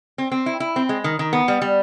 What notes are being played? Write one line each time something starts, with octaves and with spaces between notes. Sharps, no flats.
C4
C4
E4
E4
C4
G#3
D#3
D#3
B3
G3
G3